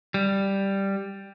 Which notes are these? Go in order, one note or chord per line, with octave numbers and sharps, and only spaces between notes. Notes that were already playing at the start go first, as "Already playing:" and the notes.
G3